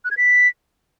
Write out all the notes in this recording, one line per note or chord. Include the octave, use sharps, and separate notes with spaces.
F#6
G#6
B6